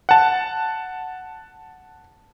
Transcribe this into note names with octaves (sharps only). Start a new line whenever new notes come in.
F#5 A5